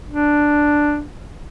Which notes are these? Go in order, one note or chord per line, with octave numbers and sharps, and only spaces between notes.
D4